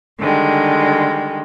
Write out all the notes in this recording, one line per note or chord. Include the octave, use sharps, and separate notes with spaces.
D3 D#3 G3 G#3